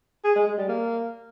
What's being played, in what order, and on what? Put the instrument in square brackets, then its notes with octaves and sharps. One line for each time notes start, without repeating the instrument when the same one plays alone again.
[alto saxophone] G#4
G#3
G#3
G3
A#3